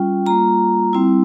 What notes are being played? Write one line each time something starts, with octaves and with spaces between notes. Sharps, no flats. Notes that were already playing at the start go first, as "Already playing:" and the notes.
Already playing: G3 C#4 F4 G5
G3 A#3 F4 A#5
G3 C4 E4